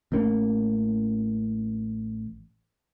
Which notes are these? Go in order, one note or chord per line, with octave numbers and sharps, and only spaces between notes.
A1 A3 A#3 C#4